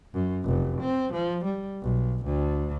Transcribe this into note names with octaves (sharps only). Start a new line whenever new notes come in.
F#2
F1
C4
F3
G3
B1
D2